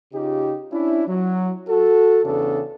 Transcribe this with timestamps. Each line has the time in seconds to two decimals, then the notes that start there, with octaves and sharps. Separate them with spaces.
0.13 C#3 D#4 F4 G4
0.71 C#4 D4 E4
1.08 F#3
1.69 F#4 A4
2.24 E2 C#3 B3 D4 A4